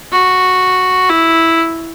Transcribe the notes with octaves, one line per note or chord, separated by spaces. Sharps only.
F#4
E4